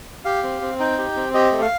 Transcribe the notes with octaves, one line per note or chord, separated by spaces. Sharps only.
G4 F5
C4
C4
D#4 G5
G4
C4
G4 D#5
A3
F5